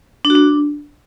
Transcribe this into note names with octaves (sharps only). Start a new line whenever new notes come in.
D4
F#4
D4